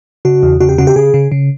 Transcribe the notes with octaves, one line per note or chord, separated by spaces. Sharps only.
C#3 F#4
E2
C#3 F#4
G4
C#3 F#4
G4
C#3 G#4
C#3
C#3